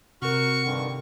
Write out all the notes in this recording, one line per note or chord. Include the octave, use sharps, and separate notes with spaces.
C3 F#4 A#4 C#6 F6
G2 D3 D#3